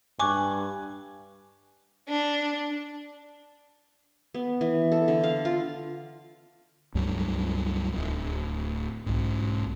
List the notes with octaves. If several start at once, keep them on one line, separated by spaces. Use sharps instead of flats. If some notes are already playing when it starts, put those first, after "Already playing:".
G2 G#5 C#6 D6 F#6
D4
B3
E3
A4
D3
F5
F4
C#2 G2 F#3 G3
D1
B1 G#2